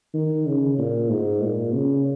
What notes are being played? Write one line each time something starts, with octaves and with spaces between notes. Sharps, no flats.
D#3
C#3
A#2
G#2
A#2
C#3